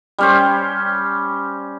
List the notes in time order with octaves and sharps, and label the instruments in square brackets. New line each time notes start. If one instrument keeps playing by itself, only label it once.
[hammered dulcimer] G3 C#4 C5